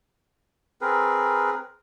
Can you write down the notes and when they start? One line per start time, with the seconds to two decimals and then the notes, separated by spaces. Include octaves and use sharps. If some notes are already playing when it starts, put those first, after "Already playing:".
0.81 C4 G#4 A#4 B4